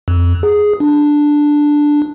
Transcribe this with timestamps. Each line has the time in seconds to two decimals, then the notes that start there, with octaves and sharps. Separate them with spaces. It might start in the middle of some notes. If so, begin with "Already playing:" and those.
0.08 F2
0.43 G#4
0.80 D4